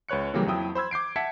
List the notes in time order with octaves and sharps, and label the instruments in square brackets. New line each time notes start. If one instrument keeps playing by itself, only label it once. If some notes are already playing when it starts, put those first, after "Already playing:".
[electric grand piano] C#2 B4 C#5 F#6 C#7
C#3 E3 F#3 G3 A#3 G4
F2 F#3 E4 G5 D#6 E6
C5 B5 E6 G#6
D6 G6 C7 D7
E5 F#5 A5 G#6 B6 C#7